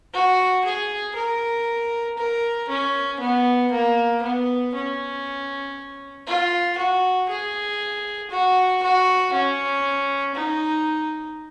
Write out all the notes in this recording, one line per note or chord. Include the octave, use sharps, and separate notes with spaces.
F#4
G#4
A#4
A#4
C#4
B3
A#3
B3
C#4
F4
F#4
G#4
F#4
F#4
C#4
D#4